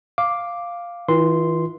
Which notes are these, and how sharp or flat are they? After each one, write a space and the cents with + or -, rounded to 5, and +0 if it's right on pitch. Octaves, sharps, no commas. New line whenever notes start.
F5 +0 D6 +0
E3 -35 F4 +0 C6 -5